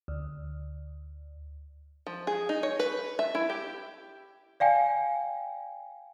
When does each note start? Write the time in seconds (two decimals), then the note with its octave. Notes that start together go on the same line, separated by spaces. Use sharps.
0.08 D2
2.07 F3
2.27 G#4
2.49 D#4
2.63 C#5
2.79 B4
3.19 E5
3.35 E4
3.50 G4
4.60 D5 F5 G5 G#5